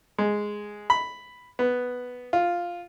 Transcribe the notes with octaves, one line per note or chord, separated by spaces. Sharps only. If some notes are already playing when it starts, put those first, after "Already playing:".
G#3
B5
B3
F4